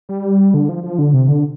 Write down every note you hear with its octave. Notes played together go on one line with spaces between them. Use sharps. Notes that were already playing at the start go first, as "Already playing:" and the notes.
G3
D3
F3
F3
D3
C3
D3